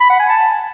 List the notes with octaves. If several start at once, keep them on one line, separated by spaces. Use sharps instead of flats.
B5
F#5
G#5
A5